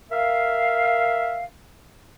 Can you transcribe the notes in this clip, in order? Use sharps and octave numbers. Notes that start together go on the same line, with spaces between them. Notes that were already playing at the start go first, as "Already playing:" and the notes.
A#4 E5 F5